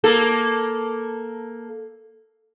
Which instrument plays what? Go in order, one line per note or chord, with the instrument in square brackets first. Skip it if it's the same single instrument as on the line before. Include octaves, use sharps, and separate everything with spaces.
[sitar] A#3 A4